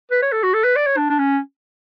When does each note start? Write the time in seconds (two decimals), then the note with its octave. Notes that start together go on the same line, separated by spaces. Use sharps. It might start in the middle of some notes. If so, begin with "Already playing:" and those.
0.11 B4
0.22 C#5
0.32 A4
0.43 F#4
0.54 A4
0.64 B4
0.76 D5
0.87 C#5
0.97 D4
1.10 D4
1.19 C#4